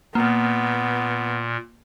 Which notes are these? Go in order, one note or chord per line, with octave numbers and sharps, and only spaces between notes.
A#2 A#3 B3